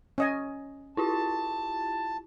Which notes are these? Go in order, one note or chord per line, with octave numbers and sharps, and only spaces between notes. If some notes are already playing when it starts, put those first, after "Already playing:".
C#4 D#5 G#5
E4 F4 G4 A5